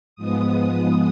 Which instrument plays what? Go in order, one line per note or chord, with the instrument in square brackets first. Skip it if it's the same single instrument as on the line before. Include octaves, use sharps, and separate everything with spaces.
[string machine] G#2 F3 G#3 B3 D#6